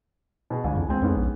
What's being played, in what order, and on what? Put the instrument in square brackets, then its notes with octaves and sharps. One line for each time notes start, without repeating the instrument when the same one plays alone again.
[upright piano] B2 G#4
[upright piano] G1 G#5 [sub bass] C#2
[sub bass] F2 [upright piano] E3
[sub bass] C#2 [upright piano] G#3 C4 G#5
[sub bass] F2 [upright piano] G#2 B3 C#4
[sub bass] A#1